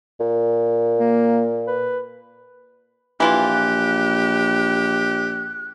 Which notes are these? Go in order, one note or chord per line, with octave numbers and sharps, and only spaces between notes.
A#2
A#3
B4
A#1 E3 E4 F4 G4 F#6